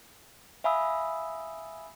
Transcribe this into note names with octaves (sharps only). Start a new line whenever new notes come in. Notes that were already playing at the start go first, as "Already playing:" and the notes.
E5 F5 G#5 B5 D#6 E6